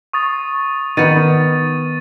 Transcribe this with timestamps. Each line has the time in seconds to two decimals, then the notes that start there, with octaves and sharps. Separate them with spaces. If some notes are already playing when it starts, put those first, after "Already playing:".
0.13 C#6 D#6 A6
0.97 D#3 B3 A6 D#7